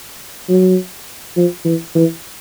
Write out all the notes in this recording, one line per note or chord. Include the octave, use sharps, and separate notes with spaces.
F#3
F3
E3
E3